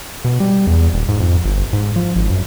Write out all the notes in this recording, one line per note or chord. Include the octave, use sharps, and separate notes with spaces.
B2
G3
E2
D#1
G#2
F2
G1
G#2
F3
G#1
F#2